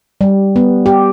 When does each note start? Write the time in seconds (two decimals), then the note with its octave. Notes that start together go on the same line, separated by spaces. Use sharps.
0.21 G3
0.56 B3
0.86 G4